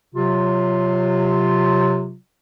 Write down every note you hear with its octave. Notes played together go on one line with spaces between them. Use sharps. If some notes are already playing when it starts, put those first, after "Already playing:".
C3 F#3 F4